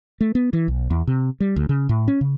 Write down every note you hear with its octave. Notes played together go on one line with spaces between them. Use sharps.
A3
B3
E3
B1
E2
C3
G3
D2
C#3
A2
C#4
C#3